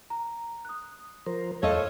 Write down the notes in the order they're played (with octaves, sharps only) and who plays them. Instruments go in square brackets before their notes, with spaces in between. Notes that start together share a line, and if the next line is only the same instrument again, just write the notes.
[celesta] A#5
D#6 F#6
[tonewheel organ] F3 A#4 C5
[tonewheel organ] E2 [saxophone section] F3 A3 C#5 [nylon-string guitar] A4 D#5 [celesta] F5